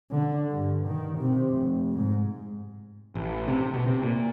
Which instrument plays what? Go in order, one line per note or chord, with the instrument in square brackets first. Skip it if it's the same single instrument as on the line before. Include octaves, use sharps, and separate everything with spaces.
[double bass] D3
G2
D#3
C3
F1
G#2
[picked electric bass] A1
C3
B2
C3
A#2